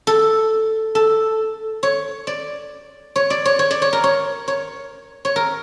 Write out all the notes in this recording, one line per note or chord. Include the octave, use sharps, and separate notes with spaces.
A4
A4
C#5
D5
C#5
D5
C#5
C#5
D5
C#5
A#4
C#5
C#5
C#5
A#4